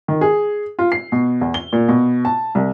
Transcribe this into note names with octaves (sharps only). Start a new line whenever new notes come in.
D#3
G#4
F4
C7
B2
E2
G7
A#2
B2
A5
C2